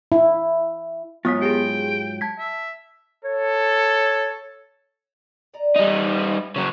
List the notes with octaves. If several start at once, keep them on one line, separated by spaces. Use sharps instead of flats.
E4
G#2 F#3 B3 F4 D#6 B6
G4 G#4 G5
A5 G#6 B6
E5
A4 C#5
D5 D#5 A#5
G3 D#4
C#3 F#3 E4 A4